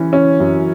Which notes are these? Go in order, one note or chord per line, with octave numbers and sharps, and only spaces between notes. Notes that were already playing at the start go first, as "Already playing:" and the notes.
Already playing: E3 C#4
C#4
F#2